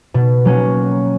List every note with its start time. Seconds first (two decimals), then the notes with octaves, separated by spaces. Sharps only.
0.14 B2
0.45 F#3 A#3 C#4